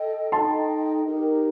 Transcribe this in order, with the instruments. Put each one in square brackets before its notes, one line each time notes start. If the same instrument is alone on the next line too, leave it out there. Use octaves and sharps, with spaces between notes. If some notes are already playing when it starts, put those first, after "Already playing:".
Already playing: [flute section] A4 D#5 G5
[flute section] D#4 A4 D#5 G5 [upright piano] A5 C6
[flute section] D#4 G4 A#4